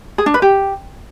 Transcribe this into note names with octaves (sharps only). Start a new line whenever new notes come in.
G#4
D4
B4
G4